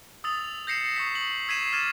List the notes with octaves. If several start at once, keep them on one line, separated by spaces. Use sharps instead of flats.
D#6 E6 A6 F7
G6 A#6 C7 C#7 E7
C#6 D#6 B6
F#7
E6 G#6 B6 C7 D#7 E7
D6 F6 G#6 A6 D#7 E7